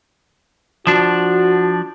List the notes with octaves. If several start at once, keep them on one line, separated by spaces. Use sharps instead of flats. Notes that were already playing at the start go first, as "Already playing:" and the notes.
F3 D4 F#4